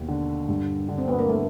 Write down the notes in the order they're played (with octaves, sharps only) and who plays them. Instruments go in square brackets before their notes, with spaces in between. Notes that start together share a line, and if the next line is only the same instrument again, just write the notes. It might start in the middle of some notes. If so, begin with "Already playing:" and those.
Already playing: [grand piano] D#2 B2
D3
G2
D3
[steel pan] C4
B3
A#3
A3